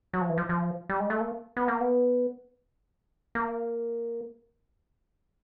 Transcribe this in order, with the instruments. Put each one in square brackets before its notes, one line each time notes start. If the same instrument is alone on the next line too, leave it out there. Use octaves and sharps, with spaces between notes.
[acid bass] F#3
F3
E3
F3
F3
G3
G#3
A3
A#3
B3
A#3
B3
A#3